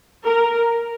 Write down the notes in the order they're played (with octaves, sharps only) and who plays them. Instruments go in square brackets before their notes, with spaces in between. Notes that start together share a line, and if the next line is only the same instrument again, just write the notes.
[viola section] A#4